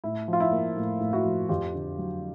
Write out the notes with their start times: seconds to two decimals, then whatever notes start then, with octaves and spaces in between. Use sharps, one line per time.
0.04 A2 E4
0.28 F3
0.33 F4
0.40 E4
0.52 A#3
0.77 A2
1.00 A2
1.13 E4 F#4
1.25 F3
1.49 F2 F4 G4
1.74 D3
1.98 F#3